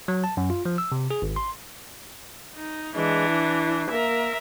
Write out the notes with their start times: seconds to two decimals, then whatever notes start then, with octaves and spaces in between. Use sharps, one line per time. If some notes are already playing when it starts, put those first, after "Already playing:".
0.08 F#3
0.24 A5
0.37 F#2
0.50 F4
0.65 F3
0.78 E6
0.92 C3
1.11 G#4
1.22 G#1
1.36 C6
2.56 D#4
2.95 E3 G#3 D4
3.29 E4
3.90 A#3 A#4 E5